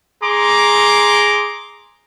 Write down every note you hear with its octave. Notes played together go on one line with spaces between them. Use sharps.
G#4 A#5 C6 D6